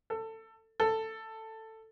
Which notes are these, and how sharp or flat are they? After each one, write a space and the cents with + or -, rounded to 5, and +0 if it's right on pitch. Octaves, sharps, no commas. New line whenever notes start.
A4 +20
A4 +10